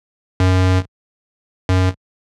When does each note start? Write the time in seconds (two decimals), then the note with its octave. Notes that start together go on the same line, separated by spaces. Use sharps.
0.40 F#2
1.69 F#2